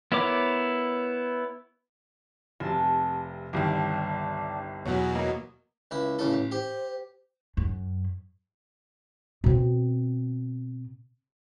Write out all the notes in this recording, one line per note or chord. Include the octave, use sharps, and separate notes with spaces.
B3 E4 A#4 C#5 D6
F1 C3 A5
G1 C2 D#3 D4 G4
E2 B2 F#3 C#4 F#4
A#3 D#4
C#2 E4
A1 C#3 E4 A4
A1
G4 C5
F#2
B2 C4